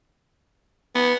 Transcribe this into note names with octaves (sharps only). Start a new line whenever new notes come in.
B3